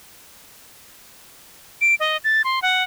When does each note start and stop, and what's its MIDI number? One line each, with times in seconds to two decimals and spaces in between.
1.81 1.95 98
2.00 2.17 75
2.24 2.42 93
2.44 2.62 84
2.62 2.83 78